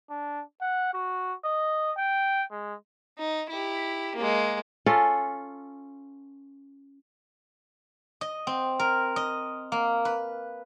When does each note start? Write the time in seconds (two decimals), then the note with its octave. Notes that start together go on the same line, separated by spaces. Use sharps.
0.10 D4
0.61 F#5
0.94 F#4
1.45 D#5
1.98 G5
2.52 G#3
3.18 D#4
3.50 E4 G4
4.15 G#3 A#3
4.86 C#4 F4 A4
8.21 D#5
8.47 C4
8.79 A#4
9.16 D#5
9.72 A#3
10.05 B4